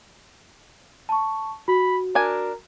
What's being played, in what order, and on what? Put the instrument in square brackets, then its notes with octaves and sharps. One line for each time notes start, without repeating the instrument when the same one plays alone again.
[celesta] A5 C#6
[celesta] F#4 [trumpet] B5
[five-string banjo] D4 G#5 [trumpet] A#4